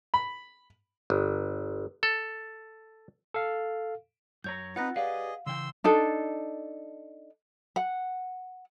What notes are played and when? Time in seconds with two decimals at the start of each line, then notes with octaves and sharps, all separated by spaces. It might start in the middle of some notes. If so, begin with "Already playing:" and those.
0.14 B5
1.10 G1
2.03 A4
3.34 A4 F5
4.44 F#2 C#5 A#5 G6
4.76 C4 C#4 D#4 F4 B4 F#5 F#6 A#6
4.96 G4 G#4 B4 D5 D#5 F5
5.46 C#3 E3 G5 C6 E6
5.84 D4 D#4 A4
7.76 F#5